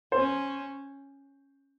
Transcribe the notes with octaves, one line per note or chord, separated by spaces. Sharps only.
C#4 C5